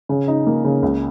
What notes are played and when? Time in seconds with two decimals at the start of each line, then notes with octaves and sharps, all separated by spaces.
0.09 C#3
0.28 D#4
0.47 A#3
0.64 C#3
0.82 C#2